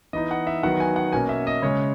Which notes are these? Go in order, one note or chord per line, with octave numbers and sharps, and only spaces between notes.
E3 B3 D#4 D#5
F#5
E5
D#3 F#3 B3 F#5
G#5
F#5
B2 A#3 C#4 G#5
E5
D#5
C#3 G#3 C#4 C#5